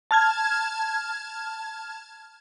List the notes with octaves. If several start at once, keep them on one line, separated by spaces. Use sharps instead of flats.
A5 F6 G#6